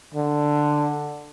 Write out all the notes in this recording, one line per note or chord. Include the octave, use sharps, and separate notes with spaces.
D3